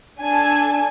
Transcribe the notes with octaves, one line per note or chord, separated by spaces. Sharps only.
D4 A4 G#5